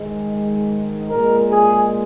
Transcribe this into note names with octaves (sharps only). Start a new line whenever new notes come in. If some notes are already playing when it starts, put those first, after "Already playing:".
Already playing: G#2 D#3 G#3
A#2 G#3 A#4
G#4